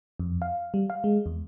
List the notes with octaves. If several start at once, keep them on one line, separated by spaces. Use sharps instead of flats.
F2
F5
G3
F5
G#3
E2